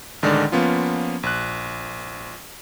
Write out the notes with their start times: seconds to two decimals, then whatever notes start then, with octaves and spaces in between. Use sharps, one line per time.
0.22 A1 D3 D#3 G#3 D5
0.52 F3 A#3 B3 C#4 F4
1.23 A#1 F#6